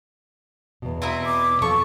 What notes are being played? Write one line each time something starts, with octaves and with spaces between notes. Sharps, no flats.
E2 B2
C4 E4 A#5 D#6
D6
F3 C4 A4 A5 C#6